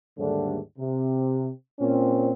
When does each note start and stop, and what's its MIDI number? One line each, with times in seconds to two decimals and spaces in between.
0.17 0.58 39
0.17 0.58 44
0.17 0.58 50
0.17 0.58 55
0.17 0.58 57
0.17 0.58 62
0.78 1.48 48
1.80 2.33 46
1.80 2.33 60
1.80 2.33 61